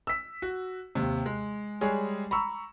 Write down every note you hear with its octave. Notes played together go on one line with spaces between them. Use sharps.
E6 B6
F#4
D#2 C3
G#3
G3 G#3 G#4 C#5
A#5 B5 C#6 E6